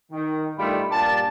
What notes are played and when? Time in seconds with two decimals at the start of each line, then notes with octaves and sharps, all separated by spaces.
0.11 D#3
0.58 G2 D#3 G3 A3 F4 B5
0.90 G2 A#2 G4 A5